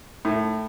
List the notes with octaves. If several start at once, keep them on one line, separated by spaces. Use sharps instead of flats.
A2